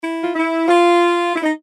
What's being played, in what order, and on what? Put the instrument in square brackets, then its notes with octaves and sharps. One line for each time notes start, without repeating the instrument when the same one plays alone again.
[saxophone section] E4
F4
E4
F4
E4
D#4